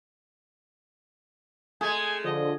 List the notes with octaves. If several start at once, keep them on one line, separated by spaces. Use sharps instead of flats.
G#3 A3 G#4 G#5
D3 F3 D#5